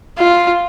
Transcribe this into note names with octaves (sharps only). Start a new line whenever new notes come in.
F4